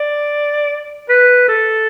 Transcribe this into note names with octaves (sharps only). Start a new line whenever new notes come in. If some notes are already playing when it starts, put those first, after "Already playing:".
Already playing: D5
B4
A4